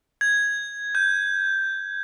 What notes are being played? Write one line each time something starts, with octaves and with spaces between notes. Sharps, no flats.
G#6
G6